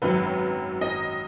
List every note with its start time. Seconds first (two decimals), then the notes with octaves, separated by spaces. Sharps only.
0.02 G#1 F#2 D#3 F#3 B4
0.81 D#5